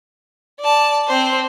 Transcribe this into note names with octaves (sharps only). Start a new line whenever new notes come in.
D5 A5
C4 C5